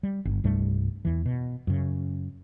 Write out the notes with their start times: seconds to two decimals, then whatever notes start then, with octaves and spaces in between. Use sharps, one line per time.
0.03 G3
0.25 G1
0.44 C2 G2 G3 A3
1.05 E2 E3
1.26 B2
1.67 F#2 C#3